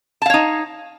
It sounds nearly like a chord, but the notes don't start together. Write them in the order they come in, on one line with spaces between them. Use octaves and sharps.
A5 F5 C#5 D#4